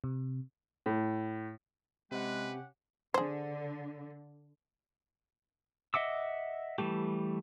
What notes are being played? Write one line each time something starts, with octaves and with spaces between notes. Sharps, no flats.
C3
A2
C3 G#3 C#4 G4 B4 F#5
D3 G#4 C5
D#5 E5 F#5 D6 E6
E3 G3 A3 G4